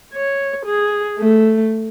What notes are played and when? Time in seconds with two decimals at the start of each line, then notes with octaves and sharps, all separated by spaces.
0.14 C#5
0.66 G#4
1.19 A3